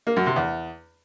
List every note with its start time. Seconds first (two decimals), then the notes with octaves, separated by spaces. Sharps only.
0.07 A#3
0.16 F#2
0.26 C3
0.36 E2